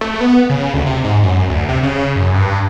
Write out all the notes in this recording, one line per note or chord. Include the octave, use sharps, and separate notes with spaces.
A3
B3
C#3
D2
C3
G#2
F#2
D2
C3
C#3
F#2
G2